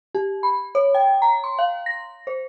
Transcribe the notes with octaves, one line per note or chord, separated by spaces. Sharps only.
G4
B5
C#5
G5
A#5
C6
F5
A#6
C5